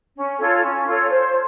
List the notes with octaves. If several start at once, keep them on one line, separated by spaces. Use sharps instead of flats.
C#4
F4 A4 C#5
C#4
F4 A4 C#5
C5